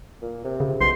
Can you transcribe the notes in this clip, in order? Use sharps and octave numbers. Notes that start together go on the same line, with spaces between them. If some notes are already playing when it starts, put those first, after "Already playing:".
A#2
C3
C#3
B1 B2 C6